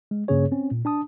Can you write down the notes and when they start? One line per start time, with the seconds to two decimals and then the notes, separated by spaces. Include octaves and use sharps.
0.11 G#3
0.28 G2 C#3 A#3 C#4 G#4 C#5
0.52 C4 C#4
0.71 A#2
0.85 D4 A5 D#6